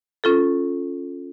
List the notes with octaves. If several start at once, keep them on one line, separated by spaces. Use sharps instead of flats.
C#4 F4 A4